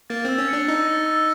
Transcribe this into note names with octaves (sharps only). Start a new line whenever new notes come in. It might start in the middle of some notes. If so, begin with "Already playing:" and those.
A#3 A6
C4 E6
C#4
D4 C#7
D#4 E6
A6
E6